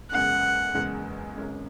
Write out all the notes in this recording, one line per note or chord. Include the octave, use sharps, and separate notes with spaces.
F#1 E2 C#3 G#3 F#5
F#1 E2 C#3 G#3
G#1 F#2 C#3 G#3 C#4